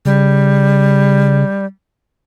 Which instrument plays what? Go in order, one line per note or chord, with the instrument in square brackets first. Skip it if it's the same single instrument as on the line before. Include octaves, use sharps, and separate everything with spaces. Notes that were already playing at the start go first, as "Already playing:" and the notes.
[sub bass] C#3 [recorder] G3